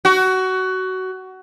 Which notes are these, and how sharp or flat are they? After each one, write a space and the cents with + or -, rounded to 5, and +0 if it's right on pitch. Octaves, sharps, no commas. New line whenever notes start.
F#4 +20